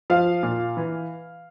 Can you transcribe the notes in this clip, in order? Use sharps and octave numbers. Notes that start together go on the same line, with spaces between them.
F3 F5
A#2
E3